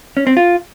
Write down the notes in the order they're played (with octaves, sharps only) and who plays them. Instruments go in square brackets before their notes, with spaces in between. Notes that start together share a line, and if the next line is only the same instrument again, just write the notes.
[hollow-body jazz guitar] C#4
C4
F4